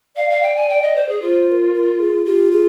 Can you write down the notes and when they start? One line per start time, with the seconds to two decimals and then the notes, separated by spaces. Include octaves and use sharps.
0.16 D5 F5
0.30 F5
0.42 G5
0.56 G#5
0.69 G5
0.82 D#5
0.95 C5
1.09 G#4
1.22 F4 C5
1.48 C5
1.52 A#4
1.73 A#4
1.99 G#4
2.25 F4 G4
2.52 G#4